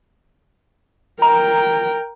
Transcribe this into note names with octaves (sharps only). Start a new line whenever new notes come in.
A#4 G5 A#5